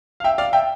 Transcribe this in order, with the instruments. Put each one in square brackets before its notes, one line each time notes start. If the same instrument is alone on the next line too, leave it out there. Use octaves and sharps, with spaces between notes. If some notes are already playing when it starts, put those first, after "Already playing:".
[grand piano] F5
E5 G5
D5 F5
E5 G5